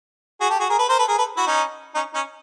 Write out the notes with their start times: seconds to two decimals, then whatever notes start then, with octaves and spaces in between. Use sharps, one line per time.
0.40 F#4 G#4
0.50 G4 A4
0.59 F#4 G#4
0.69 G#4 A#4
0.79 A4 B4
0.89 A#4 C5
0.98 A4 B4
1.08 G#4 A#4
1.18 A4 B4
1.37 E4 F#4
1.47 C#4 D#4
1.95 C#4 D#4
2.14 C#4 D#4